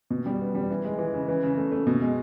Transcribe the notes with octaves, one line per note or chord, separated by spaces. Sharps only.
B2
G3
B3
G3
E3
G#3
E3
C#3
E3
C#3
A3
A3
B2
G#3